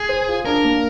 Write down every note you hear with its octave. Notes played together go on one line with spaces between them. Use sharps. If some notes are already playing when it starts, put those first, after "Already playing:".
Already playing: G#4
C5
F4
D4 A#4
A#3